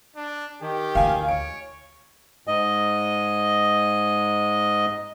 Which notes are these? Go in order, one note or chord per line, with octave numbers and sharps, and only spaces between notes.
D4
D#3 G4
D2 F5 G#5
C#5 D7
G#2 D#5